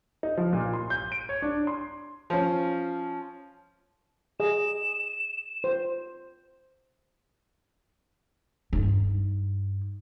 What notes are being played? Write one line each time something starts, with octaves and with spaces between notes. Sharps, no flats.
D#4
F3
A#2
C6
G6
D7
C#5
D4
C6
F3 C#4
G#4 D#5 E7
C5
G2 D#4